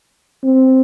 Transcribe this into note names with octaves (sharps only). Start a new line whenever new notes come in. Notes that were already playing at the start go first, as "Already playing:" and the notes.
C4